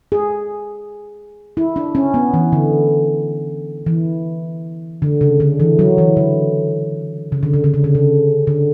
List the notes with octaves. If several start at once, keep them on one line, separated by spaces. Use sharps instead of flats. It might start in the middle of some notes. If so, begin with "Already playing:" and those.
G#4
E4
D4
C#4
B3
E3
D3
E3
D3
C#3
D3
E3
F#3
E3
D3
C#3
D3
C#3
D3
C#3
D3
C#3
D3